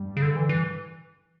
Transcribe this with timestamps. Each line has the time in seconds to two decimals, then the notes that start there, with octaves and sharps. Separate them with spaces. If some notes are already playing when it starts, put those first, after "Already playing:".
Already playing: G2
0.17 C#3
0.22 D3
0.36 E3
0.49 E3